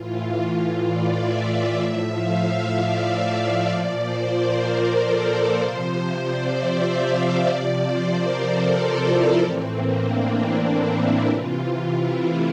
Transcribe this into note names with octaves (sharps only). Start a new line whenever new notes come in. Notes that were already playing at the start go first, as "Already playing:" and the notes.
Already playing: A2 E3 F4
D5
E5
E5
A2 F3 E5
F5
E5
D5
A#2 F3 D5
C5
A#4
A4
A#4
C3 F3 C5
C5
D5
E5
F5
D5
C3 F3 D5
C5
A#4
A4
F4
E4
A2 E3 C4
A#3
D4
D4
E4
E4
C3 E3 F4
F4
E4
A3